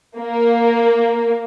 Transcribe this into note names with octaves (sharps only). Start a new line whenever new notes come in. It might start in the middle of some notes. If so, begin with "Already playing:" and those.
A#3